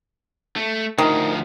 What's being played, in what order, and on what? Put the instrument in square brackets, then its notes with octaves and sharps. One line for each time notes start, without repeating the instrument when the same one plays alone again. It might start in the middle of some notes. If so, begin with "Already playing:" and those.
[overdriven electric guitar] A3
[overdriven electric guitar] D2 F3 [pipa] D#3